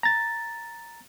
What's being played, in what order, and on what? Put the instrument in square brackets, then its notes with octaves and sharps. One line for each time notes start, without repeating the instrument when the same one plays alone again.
[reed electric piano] A#5 A6